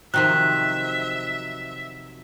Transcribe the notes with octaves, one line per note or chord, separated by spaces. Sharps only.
C3 D#3 F3 F#3 C5 E5 F#6